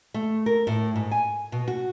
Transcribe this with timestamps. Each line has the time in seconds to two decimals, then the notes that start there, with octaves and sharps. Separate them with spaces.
0.14 A3
0.46 A#4
0.67 A2
0.96 G#2
1.11 G#5
1.52 B2
1.68 F#4